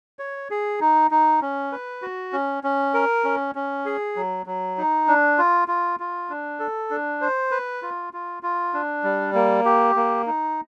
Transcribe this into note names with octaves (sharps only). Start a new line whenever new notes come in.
C#5
G#4
D#4
D#4
C#4
B4
F#4
C#4
C#4
A#4
C#4
C#4
G#4
F#3
F#3
D#4
D4
F4
F4
F4
D4
A4
D4
C5
B4
F4
F4
F4
D4
G3
A#3
G4
A#3
D#4